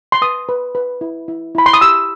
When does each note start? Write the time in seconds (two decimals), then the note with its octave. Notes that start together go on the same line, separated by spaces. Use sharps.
0.12 C6
0.22 B4 D#6
0.49 B4
0.75 B4
1.01 E4
1.28 E4
1.55 E4 B5
1.66 C6
1.73 D#6
1.81 G4 E6